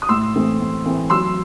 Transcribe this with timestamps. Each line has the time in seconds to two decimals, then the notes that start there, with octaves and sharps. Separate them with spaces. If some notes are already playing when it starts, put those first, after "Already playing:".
0.02 D#6
0.09 A2 C6 E6
0.34 E3 A3 C4
0.60 A2
0.86 E3 A3 C4
1.10 F#3 C6 E6